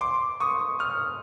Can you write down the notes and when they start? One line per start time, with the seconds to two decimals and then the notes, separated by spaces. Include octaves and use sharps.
0.01 C6 D6
0.40 C#6 D#6
0.79 D#6 F6